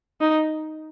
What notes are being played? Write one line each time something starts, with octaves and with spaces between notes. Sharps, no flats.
D#4